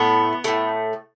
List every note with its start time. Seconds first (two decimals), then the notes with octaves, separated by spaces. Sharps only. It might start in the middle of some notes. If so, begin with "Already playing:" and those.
Already playing: A2 A3 B3
0.44 A2 A3